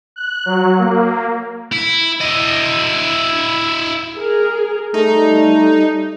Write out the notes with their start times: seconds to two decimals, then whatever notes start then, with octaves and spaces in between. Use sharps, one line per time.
0.16 F#6
0.46 F#3
0.78 A#3
1.72 E4
2.21 E4 D#5
4.16 G#4 A#4
4.94 G3 A3 D#4